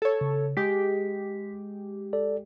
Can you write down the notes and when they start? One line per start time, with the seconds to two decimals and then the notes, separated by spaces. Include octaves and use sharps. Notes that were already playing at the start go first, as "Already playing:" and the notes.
0.02 A4 C#5
0.21 C#3
0.57 G#3 G4 B6
2.13 A4 D5